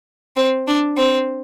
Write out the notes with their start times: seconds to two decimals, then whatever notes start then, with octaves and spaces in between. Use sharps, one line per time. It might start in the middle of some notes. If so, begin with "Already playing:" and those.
0.36 C4
0.67 D4
0.97 C4